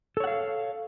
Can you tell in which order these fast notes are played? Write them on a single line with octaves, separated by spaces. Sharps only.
A4 C#5 F#5 F5